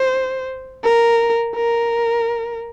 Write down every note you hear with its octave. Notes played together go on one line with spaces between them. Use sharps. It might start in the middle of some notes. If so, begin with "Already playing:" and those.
Already playing: C5
A#4
A#4